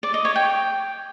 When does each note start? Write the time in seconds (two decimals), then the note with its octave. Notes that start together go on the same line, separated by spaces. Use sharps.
0.03 D5
0.14 D#5
0.25 C#5
0.36 G5